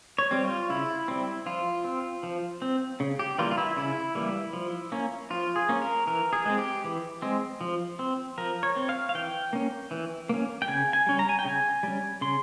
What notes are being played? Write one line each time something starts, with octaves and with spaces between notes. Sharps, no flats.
C#5
G3 C4
F4
C#3 E4
G3 C4
F3 F4
C4
F3
C4
C#3
G4
E3 G3 A#3 F4
F4
E4
C#3 E4
E3 G3 A#3
F3
A#3 C#4
F3 F4
G#4
A#3 C#4
A#4
E3 A#4
G#4
G#3 C4
G4
E3
G#3 C4
F3
C4
F3 A#4
C#5
C4
F5
F5
E3 G5
A#3 C#4
E3
A#3 C#4
G5
C#3 G#5
G#5
G3 C#4
A#5
G#5
G5
C#3 G#5
G3 C#4
C#3 C6